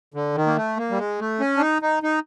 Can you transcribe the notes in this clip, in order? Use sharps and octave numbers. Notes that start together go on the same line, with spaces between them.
D3
D#3
A#3
A3
A#3
G3
G#3
A3
C#4
D4
D#4
D#4
D#4